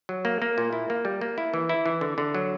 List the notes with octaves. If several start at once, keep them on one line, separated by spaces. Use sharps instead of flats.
F#3
A#3
A#3
A#2
E4
A#3
G3
A#3
E4
E3
E4
E3
D3
D3
F#3